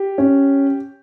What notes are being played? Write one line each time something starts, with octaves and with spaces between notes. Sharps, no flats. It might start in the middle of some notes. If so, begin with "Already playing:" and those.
Already playing: G4
C#4